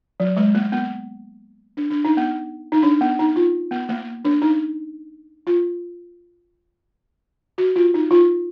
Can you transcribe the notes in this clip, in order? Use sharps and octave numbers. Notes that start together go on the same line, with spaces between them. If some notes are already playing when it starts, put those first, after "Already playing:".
F#3
G#3
A#3
B3
D4
D4
D#4
B3
D#4
D4
B3
D#4
F4
B3
A#3
D4
D#4
F4
F#4
F4
D#4
F4